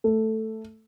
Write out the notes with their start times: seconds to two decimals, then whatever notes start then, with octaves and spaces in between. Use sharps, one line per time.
0.04 A3